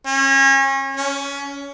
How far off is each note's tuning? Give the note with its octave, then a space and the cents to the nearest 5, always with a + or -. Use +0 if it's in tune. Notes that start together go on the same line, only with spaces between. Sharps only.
C#4 -30
C#4 +20